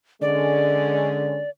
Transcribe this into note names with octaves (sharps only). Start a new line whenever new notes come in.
D3 G#3 C#4 D5